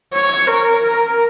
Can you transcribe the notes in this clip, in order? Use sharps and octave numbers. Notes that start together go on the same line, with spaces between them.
C#5
A#4
A#4